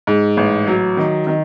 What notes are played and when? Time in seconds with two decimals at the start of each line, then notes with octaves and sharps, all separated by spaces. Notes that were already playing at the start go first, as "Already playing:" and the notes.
0.07 G#2
0.37 A1
0.67 F#3
0.97 D#3
1.27 D#3